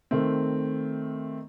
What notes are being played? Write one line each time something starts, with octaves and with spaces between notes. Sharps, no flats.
D#3 A3 C4